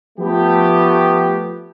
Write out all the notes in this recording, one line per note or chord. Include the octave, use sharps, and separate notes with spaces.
F3 A3 B3 G4